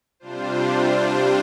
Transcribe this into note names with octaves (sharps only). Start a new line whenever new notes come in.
C3 G3 D4 F4 C5